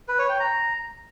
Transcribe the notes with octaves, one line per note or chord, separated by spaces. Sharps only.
B4
C#5
G5
A#5